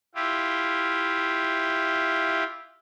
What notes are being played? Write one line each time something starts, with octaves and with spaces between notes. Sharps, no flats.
E4 F4 G4